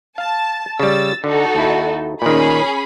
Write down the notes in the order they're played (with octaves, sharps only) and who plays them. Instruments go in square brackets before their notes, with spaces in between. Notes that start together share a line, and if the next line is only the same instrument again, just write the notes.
[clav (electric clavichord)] F5 [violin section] A5
[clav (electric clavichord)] C#3 G3 [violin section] E6 A6
[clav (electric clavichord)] D3 [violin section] D#4 F#4 A4
[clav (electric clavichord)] D#2 E4
[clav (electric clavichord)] A#2 D#3 [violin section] C#4 G#4 B5